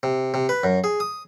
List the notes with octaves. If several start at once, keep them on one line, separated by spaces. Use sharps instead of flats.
C3
C3
B4
F#2
G#4
D#6